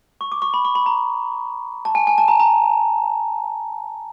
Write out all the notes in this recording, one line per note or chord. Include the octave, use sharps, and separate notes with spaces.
C#6
D6
C#6
B5
C#6
B5
A#5
A5
G#5
G#5
A5
A#5
A#5